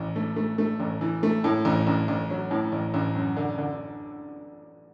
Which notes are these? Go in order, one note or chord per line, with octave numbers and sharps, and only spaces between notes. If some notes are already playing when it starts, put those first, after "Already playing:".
Already playing: A1 E3
A3
A3
A3
A1
E3
A3
A2
A1
A1
A1
F#3
A2
A1
A1
F#2
D3
D3